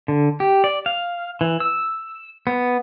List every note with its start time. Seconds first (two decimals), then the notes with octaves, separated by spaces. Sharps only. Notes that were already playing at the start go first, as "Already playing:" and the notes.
0.08 D3
0.40 G4
0.64 D5
0.86 F5
1.41 E3
1.60 E6
2.47 B3